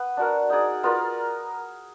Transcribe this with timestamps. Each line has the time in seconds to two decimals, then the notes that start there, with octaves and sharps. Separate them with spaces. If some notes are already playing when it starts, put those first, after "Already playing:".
Already playing: B3 B4
0.17 D4 F#4 A#4
0.50 D#4 G#4 D5
0.83 B3 F4 A#4 D5